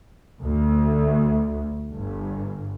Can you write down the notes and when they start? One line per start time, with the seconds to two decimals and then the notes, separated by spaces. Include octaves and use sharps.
0.42 D2
1.93 G1